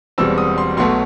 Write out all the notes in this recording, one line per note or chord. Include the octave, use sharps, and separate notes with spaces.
E1 E2 B2 G3 C4 E6
D#6
C6
B1 B2 F#3 A3 C6